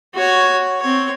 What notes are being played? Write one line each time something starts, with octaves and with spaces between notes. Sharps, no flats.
F#4 C#5
C4 C#5